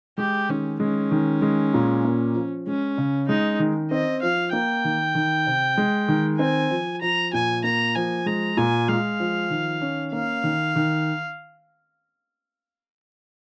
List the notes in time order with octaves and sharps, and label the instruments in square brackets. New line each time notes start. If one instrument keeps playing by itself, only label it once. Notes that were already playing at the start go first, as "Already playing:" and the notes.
[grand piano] G#3 [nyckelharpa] G4
[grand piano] D#3 [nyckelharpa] C#4
[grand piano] G#3 [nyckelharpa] C#4
[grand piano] D#3
G#3
A#2
A#3
F3
[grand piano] G#3 [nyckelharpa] C#4
[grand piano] C#3
[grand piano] G#3 [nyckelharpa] D#4
[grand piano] D#3
[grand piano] C4 [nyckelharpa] D#5
[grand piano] F3 [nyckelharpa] F5
[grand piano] A#3 [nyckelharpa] G5
[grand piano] D#3
D#3
C3
G#3
D#3
[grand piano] C4 [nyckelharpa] G#5
[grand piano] F3
[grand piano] F3 [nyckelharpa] A#5
[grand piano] A#2 [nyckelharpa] G#5
[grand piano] A#3 [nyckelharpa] A#5
[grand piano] F3 [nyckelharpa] G#5
[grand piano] G#3 [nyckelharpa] A#5
[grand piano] A#2 [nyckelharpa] G#5
[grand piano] G#3 [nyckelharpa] F5
[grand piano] F3
D#3
C#4
[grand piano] A#3 [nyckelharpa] F5
[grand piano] D#3
D#3